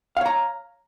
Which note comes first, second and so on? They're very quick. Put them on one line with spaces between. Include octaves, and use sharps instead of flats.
F5 C#5 A#5